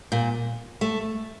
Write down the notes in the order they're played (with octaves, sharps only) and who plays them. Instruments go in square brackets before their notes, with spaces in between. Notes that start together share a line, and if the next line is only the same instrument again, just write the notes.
[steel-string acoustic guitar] A#2
A3